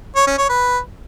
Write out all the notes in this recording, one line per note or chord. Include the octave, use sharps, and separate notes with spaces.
C#5
C#4
C#5
B4